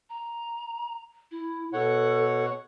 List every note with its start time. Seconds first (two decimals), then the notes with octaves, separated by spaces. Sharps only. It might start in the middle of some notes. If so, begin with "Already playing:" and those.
0.10 A#5
1.31 E4
1.73 B2 A4 C#5 F#5